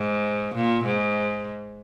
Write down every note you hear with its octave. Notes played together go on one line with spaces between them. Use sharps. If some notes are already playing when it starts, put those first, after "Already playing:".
Already playing: G#2
A#2
G#2